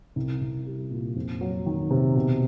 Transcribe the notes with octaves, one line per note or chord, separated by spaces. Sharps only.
C2
C2
G3
A#2
F2
F#3
D#3
C3
B2